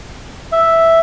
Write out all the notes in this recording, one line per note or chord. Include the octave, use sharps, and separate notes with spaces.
E5